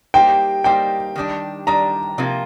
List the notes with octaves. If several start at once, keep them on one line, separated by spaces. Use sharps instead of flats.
G3 A#3 D#4 G4 C5 G5
G3 A#3 D#4 G4 C5 G5
D#3 G3 D4
D#3 G3 D4 A#5
C3 F3 A#3 F4